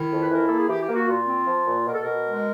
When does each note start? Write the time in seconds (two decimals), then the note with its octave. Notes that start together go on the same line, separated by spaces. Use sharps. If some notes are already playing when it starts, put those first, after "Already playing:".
Already playing: D#3 E4
0.11 F2
0.22 B4
0.31 E3 A#4
0.46 A#3 A4
0.57 G#4
0.68 E3 G4
0.82 G4
0.89 A#3
0.95 F#4
1.08 A#2 F4
1.28 C4
1.47 F3
1.66 A#2
1.86 B2 A#4
1.94 A4
2.03 B2 A#4
2.26 G#3